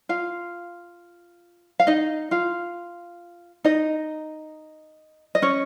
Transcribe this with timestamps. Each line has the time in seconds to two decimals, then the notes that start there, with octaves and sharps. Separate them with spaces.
0.09 F4 F5
1.80 F5
1.87 D#4 D#5
2.31 F4 F5
3.64 D#4 D#5
5.35 D#5
5.42 C#4 C#5